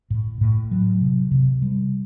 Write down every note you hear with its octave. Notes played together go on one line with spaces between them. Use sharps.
A2
A2
F#3
C3
C3
G3